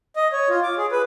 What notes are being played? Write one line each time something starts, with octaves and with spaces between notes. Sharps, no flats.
D#5
C#5
F4
D6
G#4
B4